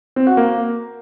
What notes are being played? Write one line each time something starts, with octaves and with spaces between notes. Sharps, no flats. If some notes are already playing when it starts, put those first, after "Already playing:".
C4
F#4
A#3